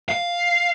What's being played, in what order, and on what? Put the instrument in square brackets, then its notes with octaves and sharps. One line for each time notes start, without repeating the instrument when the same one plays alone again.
[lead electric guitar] F5